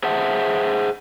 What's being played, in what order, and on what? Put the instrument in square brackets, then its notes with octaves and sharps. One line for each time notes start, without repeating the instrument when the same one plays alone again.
[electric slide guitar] G#4 C5 E5 F#5 A5